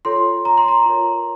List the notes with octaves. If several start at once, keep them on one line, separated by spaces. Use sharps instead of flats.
F4 A4 C#5 C6
A#5
C6
A#5
F4 A#4 C#5